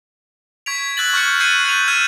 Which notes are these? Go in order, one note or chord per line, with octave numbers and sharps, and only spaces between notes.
C#6 G#6 B6 D7 F7
E6 F#6 G#6 A6 F#7
C#6 F6 G6 G#6 C#7
E6 G6 A6 C7 C#7 D#7
F#6 A6 C#7 D#7 F7
E6 F6 G6 G#6 D#7 E7